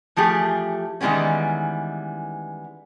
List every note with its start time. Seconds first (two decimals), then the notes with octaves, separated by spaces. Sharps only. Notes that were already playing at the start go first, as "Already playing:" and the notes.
0.16 E3 F3 A3 G4 G#4
1.01 D#3 E3 G3 G#3 B3 C#4